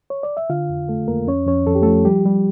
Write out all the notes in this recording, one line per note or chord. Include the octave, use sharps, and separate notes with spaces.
C#5
D5
E5
D3 F4 F5
F2
A3 A4
F2 A#3 A#4
F2 C#4 C#5
F2 C#4 C#5
F2 A4
G4
F3 A3 A4
G3 G4
G3